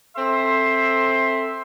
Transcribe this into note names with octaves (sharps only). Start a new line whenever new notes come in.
C4 A4 C5 E5 C6